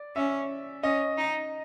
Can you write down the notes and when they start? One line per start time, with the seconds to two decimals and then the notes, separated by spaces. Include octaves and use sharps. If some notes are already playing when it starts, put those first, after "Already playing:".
Already playing: D5
0.16 C#4 E5
0.83 C#4 D#5
1.18 D#4